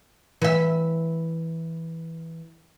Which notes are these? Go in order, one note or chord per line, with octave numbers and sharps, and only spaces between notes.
E3 E5